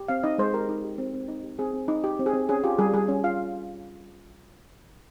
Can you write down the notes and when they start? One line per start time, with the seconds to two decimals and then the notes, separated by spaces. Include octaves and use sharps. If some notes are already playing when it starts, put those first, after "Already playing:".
Already playing: G4
0.08 C4 F5
0.23 D#4 D#5
0.38 G#3 C5
0.54 G4 A#4
0.69 D#4
0.84 G4
0.98 C4
1.14 C4
1.28 D#4
1.43 G4
1.59 C4 G#4
1.74 C4
1.88 D#4
2.04 G4
2.19 C4
2.26 G#4
2.33 C4
2.49 C#4 G#4
2.64 F4 G4
2.79 G3 G#4
2.94 G3 G#4
3.08 C#4
3.24 F4 F5